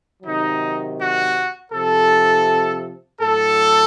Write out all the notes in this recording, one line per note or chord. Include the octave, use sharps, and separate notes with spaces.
C3 D#3 F#3 D#4
F#4
C3 F3 A4
A2 F#3 A4